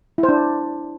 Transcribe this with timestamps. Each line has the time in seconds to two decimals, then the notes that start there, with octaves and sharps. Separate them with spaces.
0.18 E4
0.23 C5
0.29 D4